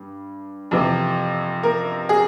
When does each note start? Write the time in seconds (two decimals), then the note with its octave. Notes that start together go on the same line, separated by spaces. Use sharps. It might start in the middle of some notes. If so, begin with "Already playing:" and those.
Already playing: G2
0.71 F2 C3 E3
1.63 A#4
2.09 G#4